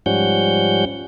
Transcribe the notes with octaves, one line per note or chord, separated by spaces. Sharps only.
G#2 F3 G3 C#4 F#5 G6